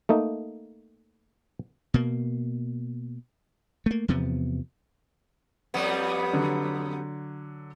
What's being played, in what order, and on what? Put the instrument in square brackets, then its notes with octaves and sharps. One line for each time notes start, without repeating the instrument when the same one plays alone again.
[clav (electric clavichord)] A3 A#3 D#4
[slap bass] B2 A#3
A3 A#3
E2 C3 F3 B3
[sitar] F2 G3 B3
[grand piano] D3 F#3